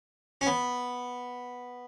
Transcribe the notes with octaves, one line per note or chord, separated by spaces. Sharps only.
C#4
B3